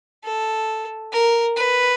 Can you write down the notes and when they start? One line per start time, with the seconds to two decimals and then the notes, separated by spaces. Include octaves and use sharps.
0.24 A4
1.12 A#4
1.56 B4